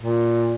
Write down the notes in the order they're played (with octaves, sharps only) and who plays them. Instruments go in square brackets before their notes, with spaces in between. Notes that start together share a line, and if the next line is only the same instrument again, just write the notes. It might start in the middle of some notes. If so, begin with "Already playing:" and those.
[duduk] A#2